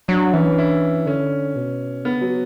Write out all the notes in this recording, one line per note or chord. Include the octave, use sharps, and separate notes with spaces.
F#3 D4
E3 C#4
D4
E4
D3 C#4
B2
C#3 B3
F#3